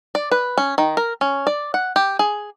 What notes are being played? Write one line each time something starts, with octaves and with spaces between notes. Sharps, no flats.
D5
B4
C#4
D#3
A#4
C#4
D5
F#5
G4
G#4